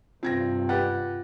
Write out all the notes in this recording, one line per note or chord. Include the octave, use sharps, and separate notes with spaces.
G2 C3 C4 F4 G#6 A#6
G4 B4 F#5 A6